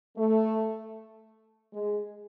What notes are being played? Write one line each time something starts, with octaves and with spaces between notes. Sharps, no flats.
A3
G#3